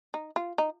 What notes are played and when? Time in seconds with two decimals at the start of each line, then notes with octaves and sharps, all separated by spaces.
0.14 D#4
0.36 F4
0.58 D#4